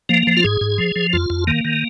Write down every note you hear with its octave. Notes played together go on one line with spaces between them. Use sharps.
F3 A#3
F3
F4
G#2 G#4
G#2
F3
F3
F2 F4
F2
D#3 A#3
D#3